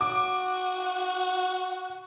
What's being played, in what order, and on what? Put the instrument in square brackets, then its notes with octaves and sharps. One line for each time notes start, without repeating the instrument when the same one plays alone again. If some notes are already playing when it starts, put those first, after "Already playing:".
[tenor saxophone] F#4 [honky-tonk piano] D6